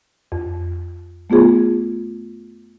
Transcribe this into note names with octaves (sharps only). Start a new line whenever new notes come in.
F2
A3 B3 F4 G#4